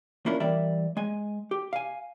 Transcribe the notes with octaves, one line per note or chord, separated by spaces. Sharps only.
A#3 C#4 D4 E4 F4 A#4
E3 G3 A#4 D5 E5
G#3 G#5
G4
F5 G#5